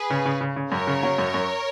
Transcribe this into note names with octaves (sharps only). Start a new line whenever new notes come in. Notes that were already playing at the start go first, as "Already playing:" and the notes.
Already playing: G#4 B4
C#3
C#3
C#3
C#3
F#2 A#4 C#5
C#3
F#3
F#2
F#2